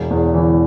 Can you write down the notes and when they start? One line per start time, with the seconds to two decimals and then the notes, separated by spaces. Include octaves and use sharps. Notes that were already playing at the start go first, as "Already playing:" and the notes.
Already playing: E1
0.11 E2
0.34 E3